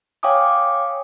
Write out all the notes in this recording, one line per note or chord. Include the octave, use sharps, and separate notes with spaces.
C#5 F5 G5 G#5 D6 D#6